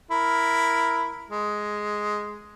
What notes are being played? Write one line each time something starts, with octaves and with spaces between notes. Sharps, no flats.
E4 A#4
G#3